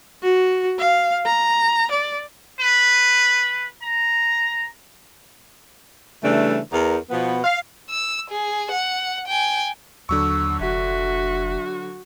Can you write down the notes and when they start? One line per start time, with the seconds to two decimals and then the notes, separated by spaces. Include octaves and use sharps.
0.23 F#4
0.79 F5
1.26 A#5
1.91 D5
2.60 B4
3.82 A#5
6.23 C#3 E3 G3 A3 D4
6.72 E2 A#4
7.10 B2 F3 B3
7.44 F5
7.90 E6
8.30 G#4
8.71 F#5
9.27 G5 G#5
10.09 D#2 D3 F#3 C#6 E6
10.60 F1 F#4 E5